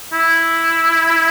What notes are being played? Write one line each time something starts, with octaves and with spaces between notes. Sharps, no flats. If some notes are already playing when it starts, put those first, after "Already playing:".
E4